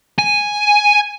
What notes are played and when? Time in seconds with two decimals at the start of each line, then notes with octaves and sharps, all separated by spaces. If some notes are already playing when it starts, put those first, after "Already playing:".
0.19 G#5